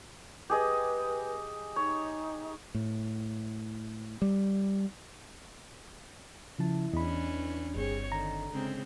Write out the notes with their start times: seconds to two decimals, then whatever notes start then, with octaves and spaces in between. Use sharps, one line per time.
0.50 G4 G#4 B4 D#5
1.76 D#4 C#5
2.75 A2
4.22 G3
6.59 C#3 F3 E4 A5
6.93 E2 C#4 D4 D#5 B5
7.27 E3
7.76 G1 G2 C4 G#4 C#5
8.12 D3 D#3 A#5
8.52 C#3 G#3 C4